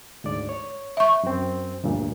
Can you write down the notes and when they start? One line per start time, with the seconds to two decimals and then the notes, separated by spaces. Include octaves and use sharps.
0.24 D2 G#2 D5
0.49 C#5
0.97 E5 C#6
1.23 F#2 C4
1.83 D2 G2 A#2